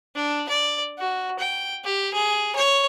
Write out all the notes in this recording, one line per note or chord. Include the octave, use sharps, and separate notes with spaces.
D4
D5
F#4
G5
G4
G#4
C#5